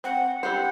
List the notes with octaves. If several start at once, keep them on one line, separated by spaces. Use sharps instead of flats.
C4 F#5
E4 G4 C5 F#5